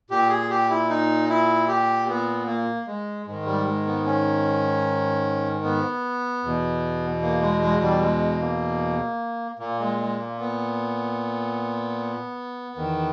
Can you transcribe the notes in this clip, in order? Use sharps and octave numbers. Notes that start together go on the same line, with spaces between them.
A#2 G4
G#4
G4
E4
D#4
E4
G4
B3
A#3
G#3
G#2 D#3 G#3
G3
G#3
B3
C#4
B3
E2 B2
A#3
G#3
G#3
G3
G#3
A#3
A#2 A#3
G#3
G#3
A#3
B3
E2 D#3